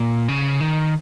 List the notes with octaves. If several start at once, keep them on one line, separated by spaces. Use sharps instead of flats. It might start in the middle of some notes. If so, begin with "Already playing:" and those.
Already playing: A#2
C#3
D#3